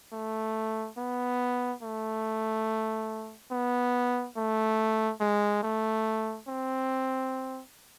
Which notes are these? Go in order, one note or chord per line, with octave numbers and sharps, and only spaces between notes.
A3
B3
A3
B3
A3
G#3
A3
C4